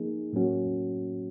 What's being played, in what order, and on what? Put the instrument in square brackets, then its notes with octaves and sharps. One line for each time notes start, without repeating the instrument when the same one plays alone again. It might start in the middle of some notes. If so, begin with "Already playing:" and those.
Already playing: [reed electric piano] F3 A#3 D#4 G#4
A2 F#3 A#3 C#4 F#4